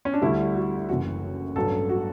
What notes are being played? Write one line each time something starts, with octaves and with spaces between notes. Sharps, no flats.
C#4
D4
D2 D3 G3 E4
F#4
E4
F#1 F#2 E3 F#4
A1 G2 F#3 A4
F#4